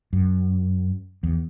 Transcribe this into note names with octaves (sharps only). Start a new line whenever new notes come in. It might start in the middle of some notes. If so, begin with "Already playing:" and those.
F#2
E2